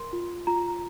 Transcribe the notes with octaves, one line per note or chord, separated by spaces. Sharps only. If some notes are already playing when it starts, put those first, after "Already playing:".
Already playing: A#4 C6
F4
F4 A#5